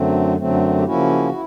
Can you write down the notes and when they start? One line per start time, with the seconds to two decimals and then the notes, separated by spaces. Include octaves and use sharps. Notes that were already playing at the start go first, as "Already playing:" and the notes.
Already playing: F#2 D3 F#3 A3 C4
0.37 F#2 D3 F#3 A3 C4
0.78 G4
0.84 C#3 F3 A#3 C#4 E4 F#4
1.32 E4